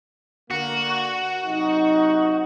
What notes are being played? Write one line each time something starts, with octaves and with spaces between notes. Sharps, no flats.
D3 A#3 F#4
C3 F#3 D#4